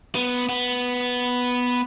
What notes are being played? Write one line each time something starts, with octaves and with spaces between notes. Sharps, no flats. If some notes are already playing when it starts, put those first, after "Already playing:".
B3
B3